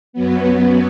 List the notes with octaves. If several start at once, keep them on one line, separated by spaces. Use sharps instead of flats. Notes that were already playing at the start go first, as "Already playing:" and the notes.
F#2 F#3 B3